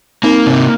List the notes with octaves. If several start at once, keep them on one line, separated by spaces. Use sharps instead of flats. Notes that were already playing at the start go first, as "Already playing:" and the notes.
A#3 C4 D#4
C3 C4